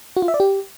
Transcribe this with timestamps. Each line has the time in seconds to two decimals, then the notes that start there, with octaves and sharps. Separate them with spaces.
0.17 F#4
0.22 F4
0.28 E5
0.34 D5
0.40 G4